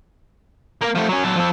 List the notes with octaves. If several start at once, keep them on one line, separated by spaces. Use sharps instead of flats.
A#3 A#4
F3 A3
F#3 C#4
F#3 A4
F3 A4